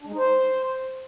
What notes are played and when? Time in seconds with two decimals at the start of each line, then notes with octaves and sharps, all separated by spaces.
0.02 D4
0.07 G#3
0.12 D#4
0.17 C5